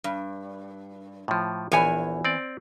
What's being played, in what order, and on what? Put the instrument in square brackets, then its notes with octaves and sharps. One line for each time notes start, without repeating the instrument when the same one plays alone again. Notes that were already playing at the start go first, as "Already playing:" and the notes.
[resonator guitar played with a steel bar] G2
[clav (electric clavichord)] A2 F3
[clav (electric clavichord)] A#1 C#5 [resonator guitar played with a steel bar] E2 G#5
[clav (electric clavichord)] C4 D5